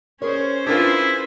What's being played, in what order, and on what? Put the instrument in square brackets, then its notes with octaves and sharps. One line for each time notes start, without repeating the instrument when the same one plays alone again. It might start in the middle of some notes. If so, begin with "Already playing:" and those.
[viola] C#4 C5 [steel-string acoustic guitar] G#4 A#4 C#5
[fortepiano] D4 F4 [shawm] E4 [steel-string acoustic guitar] G#4 A#4 B4